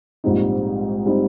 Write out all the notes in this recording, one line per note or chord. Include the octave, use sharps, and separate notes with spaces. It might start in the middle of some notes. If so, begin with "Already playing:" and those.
A#1 G#2 G3 C4 D#4
G3 C4 D#4